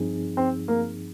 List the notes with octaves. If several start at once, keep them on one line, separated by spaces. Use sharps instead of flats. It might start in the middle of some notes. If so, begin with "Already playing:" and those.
Already playing: G2 F3 C4 D#4 G#4
C4
A#3